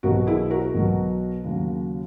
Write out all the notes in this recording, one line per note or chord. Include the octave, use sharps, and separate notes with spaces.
B1 B2 F#3 F#4 A#4
E4 G#4
F#4 A#4
B1 B2 F#3
D#2 C#3 F#3